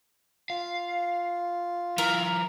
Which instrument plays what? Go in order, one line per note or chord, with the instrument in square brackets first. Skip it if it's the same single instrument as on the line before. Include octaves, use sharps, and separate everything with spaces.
[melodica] F4 [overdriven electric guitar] F5
[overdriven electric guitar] F3 E4 [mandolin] A#4